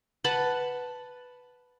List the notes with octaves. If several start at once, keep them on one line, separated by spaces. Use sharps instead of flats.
B4 F#5 A5 B5